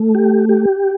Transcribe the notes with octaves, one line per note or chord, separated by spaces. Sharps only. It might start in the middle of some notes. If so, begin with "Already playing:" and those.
Already playing: A3
G4
G4